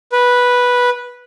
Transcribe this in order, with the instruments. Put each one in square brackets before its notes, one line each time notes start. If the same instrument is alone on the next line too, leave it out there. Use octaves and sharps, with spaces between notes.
[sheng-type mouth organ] B4